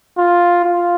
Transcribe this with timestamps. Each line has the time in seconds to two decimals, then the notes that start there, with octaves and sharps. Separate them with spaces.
0.18 F4
0.65 F4